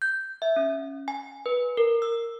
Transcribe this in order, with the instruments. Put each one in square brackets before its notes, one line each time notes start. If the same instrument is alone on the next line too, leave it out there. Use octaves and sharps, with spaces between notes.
[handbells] G6
E5
C#4
G#5
B4
A#4
E6